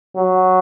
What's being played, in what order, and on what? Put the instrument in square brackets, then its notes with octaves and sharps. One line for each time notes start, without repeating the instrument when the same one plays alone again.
[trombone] F#3